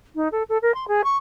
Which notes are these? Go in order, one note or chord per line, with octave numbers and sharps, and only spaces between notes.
D#4
A4
A4
A#4
C6
G#4
C#6